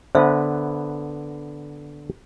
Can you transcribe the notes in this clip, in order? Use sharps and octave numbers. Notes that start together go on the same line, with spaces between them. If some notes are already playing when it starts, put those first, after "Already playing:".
D3 B3 B4 C5 E5